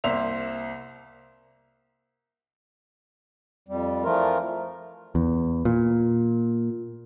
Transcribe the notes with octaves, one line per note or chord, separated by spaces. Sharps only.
C2 A#3 C5 E5 F7
F2 G3
E3 F3 A3 F4 A#4
E2
A#2